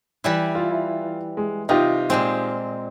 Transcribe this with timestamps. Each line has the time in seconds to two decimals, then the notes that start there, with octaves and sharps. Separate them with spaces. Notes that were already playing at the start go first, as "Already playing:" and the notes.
0.24 E3 G3 E4
0.55 F4
1.37 G#3
1.69 C3 D#4 F4 G4
2.10 A#2 G#3 C4